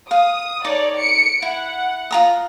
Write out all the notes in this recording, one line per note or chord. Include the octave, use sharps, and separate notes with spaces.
F5 D#6
D#4 A4 C#5 D5 D6
C#7 D7
E4 F#5
F4 A#5 D#6